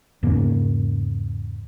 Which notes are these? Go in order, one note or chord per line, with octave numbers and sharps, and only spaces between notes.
E2 G#2 C#3 A#3